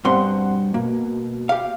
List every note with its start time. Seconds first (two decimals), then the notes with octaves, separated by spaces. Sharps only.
0.05 G2 B2 C4 C5 F#5 C6
0.74 B2 A#3
1.49 G4 F5